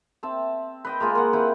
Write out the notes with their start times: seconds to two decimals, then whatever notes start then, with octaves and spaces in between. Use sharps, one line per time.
0.23 C4 E5 A5
0.85 B4 D#5 G5
1.00 G#3 A#3 F4 G#4
1.15 A#4 F#5
1.33 C4 E4 G4 B4